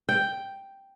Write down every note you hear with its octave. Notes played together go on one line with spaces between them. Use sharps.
G5